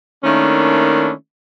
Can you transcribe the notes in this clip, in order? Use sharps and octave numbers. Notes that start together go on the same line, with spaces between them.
D#3 A3 A#3 C#4 D4 E4